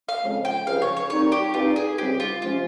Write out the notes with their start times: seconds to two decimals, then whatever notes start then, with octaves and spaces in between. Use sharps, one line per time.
0.09 F5
0.23 F2 C#3 G#3
0.45 G5
0.67 C#2 C3 F3 F5
0.82 C#5
0.97 C#5
1.10 A#2 G3 C4 D#4 C#5
1.32 G4
1.54 G2 G3 C4 D#4 F4
1.76 G#4
1.98 C#2 C3 G3 C4 G4
2.20 F4
2.42 C3 F3 G#3 C#4 F4